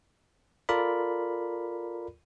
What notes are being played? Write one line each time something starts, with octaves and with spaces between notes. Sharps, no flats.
F4 A4 A#4 D5 B5